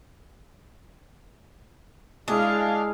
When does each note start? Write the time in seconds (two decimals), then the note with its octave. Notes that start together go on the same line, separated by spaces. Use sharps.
2.28 G#3 D4 E4 G#4 D#5 F5